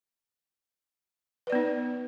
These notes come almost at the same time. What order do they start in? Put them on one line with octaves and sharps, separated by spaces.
B4 D5 B3 D#4